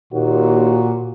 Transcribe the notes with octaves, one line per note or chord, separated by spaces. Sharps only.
D#2 A#2 F#4